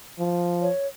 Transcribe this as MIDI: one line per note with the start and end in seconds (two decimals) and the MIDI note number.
0.19 0.69 53
0.62 0.87 73